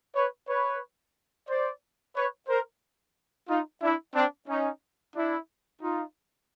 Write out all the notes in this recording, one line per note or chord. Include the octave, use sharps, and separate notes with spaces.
B4 C#5
B4 C#5
C5 D5
B4 C#5
A#4 C5
D#4 F4
D4 E4
C4 D4
C#4 D#4
D4 E4
D#4 F4